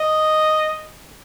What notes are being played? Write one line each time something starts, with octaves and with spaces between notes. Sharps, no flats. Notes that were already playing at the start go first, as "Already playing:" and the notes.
Already playing: D#5